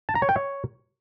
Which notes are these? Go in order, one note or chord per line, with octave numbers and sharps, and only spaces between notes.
A5
A#5
C#5
G5
C#5